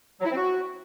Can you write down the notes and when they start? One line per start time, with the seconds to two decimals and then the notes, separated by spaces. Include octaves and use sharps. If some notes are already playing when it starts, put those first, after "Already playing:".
0.20 F#3
0.25 E4
0.31 C4
0.36 F#4